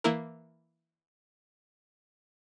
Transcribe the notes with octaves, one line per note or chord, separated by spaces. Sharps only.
E3 A#3 E4 A#4